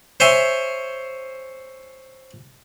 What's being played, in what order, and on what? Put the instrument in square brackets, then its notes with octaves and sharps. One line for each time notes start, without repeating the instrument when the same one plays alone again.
[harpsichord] C5 C#5 E5 G#5 C6